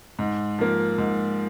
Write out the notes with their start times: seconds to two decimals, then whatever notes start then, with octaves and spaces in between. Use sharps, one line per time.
0.19 G#2
0.59 F3 A#3
0.98 G#2